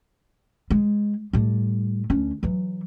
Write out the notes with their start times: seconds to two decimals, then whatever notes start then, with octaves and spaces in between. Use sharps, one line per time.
0.71 G#3
1.33 A2 G3
2.10 D2 C#4
2.43 E3 F#3